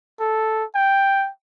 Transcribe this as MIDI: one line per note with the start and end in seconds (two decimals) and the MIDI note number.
0.20 0.64 69
0.75 1.29 79